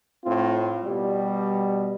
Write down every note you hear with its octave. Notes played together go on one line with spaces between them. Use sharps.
A2 C4 F4
B2 G3